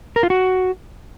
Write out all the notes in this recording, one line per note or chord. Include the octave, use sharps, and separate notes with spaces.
A#4
F4
F#4